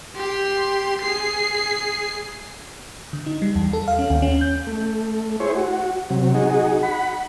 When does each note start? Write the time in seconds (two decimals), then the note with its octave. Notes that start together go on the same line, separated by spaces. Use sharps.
0.15 G4 C6
1.02 G#4 C7
3.13 D3
3.26 D#4
3.42 G3
3.56 E2
3.73 A4
3.88 F5
3.99 C#4
4.10 D#2
4.22 C#4
4.41 G6
4.67 A3
5.40 E4 G#4 C5 C#5
5.55 F#4
6.10 C3 F#3
6.34 D#4 F#4 G#4
6.83 F#5 B5